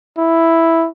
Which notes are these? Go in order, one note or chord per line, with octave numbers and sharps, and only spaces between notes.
E4